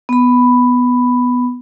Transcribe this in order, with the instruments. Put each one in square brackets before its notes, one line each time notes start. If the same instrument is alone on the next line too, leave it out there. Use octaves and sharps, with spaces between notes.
[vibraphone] B3 B5